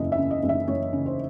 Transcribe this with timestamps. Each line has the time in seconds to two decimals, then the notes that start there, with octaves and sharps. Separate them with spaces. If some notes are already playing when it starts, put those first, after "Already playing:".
Already playing: F#1 E2 C#3 D#5 E5
0.12 E5
0.18 C#3
0.31 D#5
0.43 F#1
0.49 E5
0.68 F#1 C#5
0.93 C#3
1.06 C5